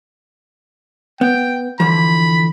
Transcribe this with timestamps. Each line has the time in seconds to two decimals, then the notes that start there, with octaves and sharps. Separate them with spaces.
1.21 B3 G5
1.80 D3 E3 F3 B5